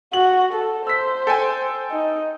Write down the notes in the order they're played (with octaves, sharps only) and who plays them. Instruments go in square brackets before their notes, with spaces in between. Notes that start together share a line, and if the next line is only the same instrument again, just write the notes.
[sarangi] F#4 [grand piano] F#7
[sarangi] A4
[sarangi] C5 [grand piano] E6 B6
[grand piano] A4 G5 G#5
[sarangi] D#4